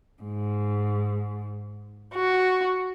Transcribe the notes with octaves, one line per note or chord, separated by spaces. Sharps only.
G#2
F#4